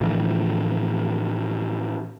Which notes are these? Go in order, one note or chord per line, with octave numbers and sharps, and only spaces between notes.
A2 D3 E3 F3